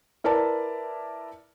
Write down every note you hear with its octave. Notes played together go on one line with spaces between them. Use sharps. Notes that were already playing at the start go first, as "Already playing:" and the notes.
E4 A#4 B4 D5 A5